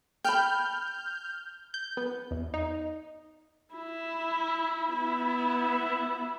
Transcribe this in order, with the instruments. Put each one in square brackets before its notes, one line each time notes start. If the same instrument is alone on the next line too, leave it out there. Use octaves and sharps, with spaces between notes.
[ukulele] G5 A5 B5 [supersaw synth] F6 G6
[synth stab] G6
B3
E2
D#4
[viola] E4
B3 E4